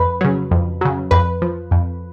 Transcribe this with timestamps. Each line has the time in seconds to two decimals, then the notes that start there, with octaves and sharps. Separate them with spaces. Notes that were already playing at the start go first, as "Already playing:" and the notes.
Already playing: F2 B4
0.21 C#3 F#3
0.51 F2
0.81 C#3 F#3
1.11 F2 B4
1.42 F3
1.71 F2